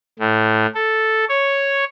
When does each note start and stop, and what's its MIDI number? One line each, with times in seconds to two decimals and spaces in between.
0.19 0.66 45
0.75 1.25 69
1.29 1.84 73